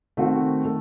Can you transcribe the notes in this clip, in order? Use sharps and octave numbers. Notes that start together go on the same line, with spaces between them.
D#3 A3 C4 F#4
D#3 A3